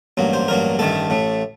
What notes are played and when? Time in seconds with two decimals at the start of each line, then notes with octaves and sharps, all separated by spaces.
0.17 A1 G2 F#3 A#3
0.33 C5
0.48 A1 G2 F#3 A#3 A#4
0.79 A1 G2 D#3 A3 A4
1.10 A1 A2 A3